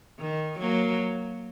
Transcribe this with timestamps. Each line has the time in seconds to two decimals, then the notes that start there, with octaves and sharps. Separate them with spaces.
0.19 D#3
0.59 F#3 A#3